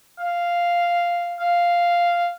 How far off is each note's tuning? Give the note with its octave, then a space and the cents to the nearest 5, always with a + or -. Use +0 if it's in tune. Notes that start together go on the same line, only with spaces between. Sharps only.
F5 -5
F5 -5